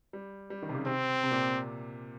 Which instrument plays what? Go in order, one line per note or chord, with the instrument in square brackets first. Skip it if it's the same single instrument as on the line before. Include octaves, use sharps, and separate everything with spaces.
[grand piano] G3
G3
D#3
C3
C#3
[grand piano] C3 [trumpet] C4
[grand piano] C3
A#2